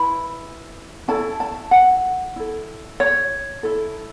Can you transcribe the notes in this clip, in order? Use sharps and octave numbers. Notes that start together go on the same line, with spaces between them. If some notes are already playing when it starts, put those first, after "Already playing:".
Already playing: E4 B4 B5
C#4 E4 A4 A5
A5
F#5
E4 A4
C#5
E4 A4